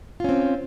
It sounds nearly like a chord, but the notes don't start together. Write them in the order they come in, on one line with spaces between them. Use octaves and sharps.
F4 C#4 C4